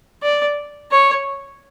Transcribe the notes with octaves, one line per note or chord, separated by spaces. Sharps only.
D5
C#5